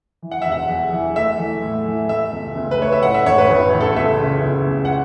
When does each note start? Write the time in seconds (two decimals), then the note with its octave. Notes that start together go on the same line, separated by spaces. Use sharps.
0.22 E3
0.31 F#5
0.42 E1 E5
0.52 F#5
0.69 E2
0.92 E3
1.16 A3 E5
1.39 E3
1.63 A2
1.86 E3
2.09 A3 E5
2.33 C#2
2.56 C#2
2.71 B4
2.79 A3 C#5
2.92 E5
3.03 A2 F#5
3.14 E5
3.26 A1 C#5
3.38 B4
3.50 A1
3.73 A1
3.80 A4
3.96 C#2 E5
4.20 C#3
4.44 C#2
4.67 C#2
4.85 F#5